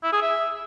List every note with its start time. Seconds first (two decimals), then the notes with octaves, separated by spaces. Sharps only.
0.03 E4
0.12 G#4
0.22 E5